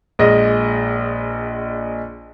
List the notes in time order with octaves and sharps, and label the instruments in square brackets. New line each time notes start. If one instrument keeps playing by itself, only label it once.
[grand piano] A#1 G#3 D#5